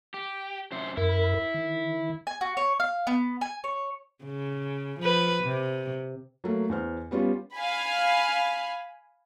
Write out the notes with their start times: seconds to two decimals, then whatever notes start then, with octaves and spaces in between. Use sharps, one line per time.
0.14 G4
0.72 F#2 C3 C5
0.97 F#2 E4 A#4 B5
1.54 D#3
2.27 G#5
2.41 F#4
2.57 C#5
2.80 F5
3.07 B3
3.41 G#5
3.64 C#5
4.24 C#3
5.00 F3 B4
5.43 C3
6.44 F#3 A3 A#3
6.69 E2 C5 F6
7.11 G3 B3 C#4 F4 G4
7.54 F5 G#5 B5